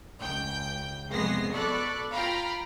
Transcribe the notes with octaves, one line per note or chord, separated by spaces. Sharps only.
C#2 G5 G6
C2 F2 G#3 B3 A#6 C7
B2 A4 D5 B5 C#6 F#6
F4 F5 G5 A#5 B5